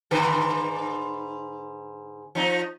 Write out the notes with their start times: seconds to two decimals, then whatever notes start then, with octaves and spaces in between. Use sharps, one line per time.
0.11 G#2 D3 B4
2.35 F3 D#4